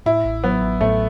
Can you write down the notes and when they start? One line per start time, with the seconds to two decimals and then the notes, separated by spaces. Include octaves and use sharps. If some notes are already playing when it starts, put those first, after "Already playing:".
0.06 A2 E4
0.25 A1
0.44 F#3 B3
0.62 A1
0.81 A2 A3